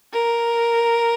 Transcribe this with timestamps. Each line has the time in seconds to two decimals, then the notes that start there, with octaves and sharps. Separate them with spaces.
0.13 A#4